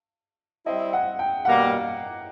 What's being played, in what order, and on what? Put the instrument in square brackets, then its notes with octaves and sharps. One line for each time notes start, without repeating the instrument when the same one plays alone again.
[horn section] G3 C4 E4 [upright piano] D#5
[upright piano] F#5
G5
[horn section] B2 G3 A#3 [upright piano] F#5